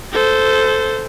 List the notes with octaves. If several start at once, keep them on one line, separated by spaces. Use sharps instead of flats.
A4 C5